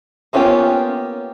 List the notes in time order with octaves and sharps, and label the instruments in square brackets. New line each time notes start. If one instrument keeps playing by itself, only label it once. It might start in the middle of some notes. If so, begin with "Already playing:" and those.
[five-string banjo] A#3 B3 C#4 F4 G4